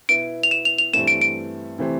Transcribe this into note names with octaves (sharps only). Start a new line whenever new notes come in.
B2 B3 E4 D7
F7
E7
F7
F7
G2 E3 A3 C4 E7
D7
D7
C3 E3 A3 C4